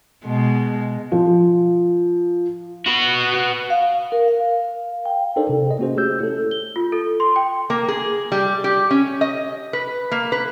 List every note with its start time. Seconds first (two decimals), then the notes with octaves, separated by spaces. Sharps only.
0.24 B2 G#3
1.12 F3
2.86 B3 F#4
3.70 F5
4.12 A#4
4.28 F5
5.06 G5
5.36 D4 D#4 A4 A#4 C5 D5
5.49 C3
5.66 G#4 D#5
5.79 A#3 C#4 F#4 G#4 C5
5.96 A3 C#4 G4 C#5 E6 G6
6.20 E4 A4
6.51 G7
6.76 F4
6.92 A4
7.20 C6
7.36 G5
7.70 A#3
7.88 G#4
8.32 G3
8.64 G4
8.91 C#4
9.21 D#5
9.73 B4
10.12 A#3
10.32 B4